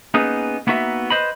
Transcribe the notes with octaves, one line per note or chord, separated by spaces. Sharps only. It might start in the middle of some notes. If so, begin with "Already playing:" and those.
A#3 B3 C#4 D#4 G#4 B4
A#3 B3 D#4 F#4 E5
B4 C5 D#5 B5